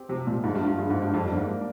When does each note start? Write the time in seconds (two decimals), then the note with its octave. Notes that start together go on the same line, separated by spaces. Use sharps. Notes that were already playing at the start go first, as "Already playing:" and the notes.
Already playing: C4 G4
0.09 C3 F3
0.27 A#2 F3
0.44 G#2 A#3
0.55 G2
0.61 F4
0.67 G2
0.78 G2 G#4
0.90 G#2
0.96 F3
1.02 G2
1.13 F2 G3
1.25 G2
1.31 A#3
1.37 G#2
1.48 D4